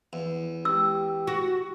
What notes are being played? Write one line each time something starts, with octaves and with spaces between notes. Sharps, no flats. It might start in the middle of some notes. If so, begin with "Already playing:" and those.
E2
G4 E6
F#4